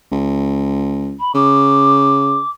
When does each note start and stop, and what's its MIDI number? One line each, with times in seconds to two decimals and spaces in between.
0.12 1.16 37
1.20 1.32 83
1.35 2.40 49
1.35 2.50 86